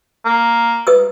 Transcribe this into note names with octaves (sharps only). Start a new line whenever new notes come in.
A#3
B4 D#6 E6